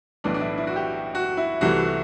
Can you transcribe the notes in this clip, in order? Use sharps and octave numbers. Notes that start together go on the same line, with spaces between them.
B1 A2 E3 B3 D4
D4
E4
E4
F#4
G4
F#4
E4
C2 C3 E3 A3 F#4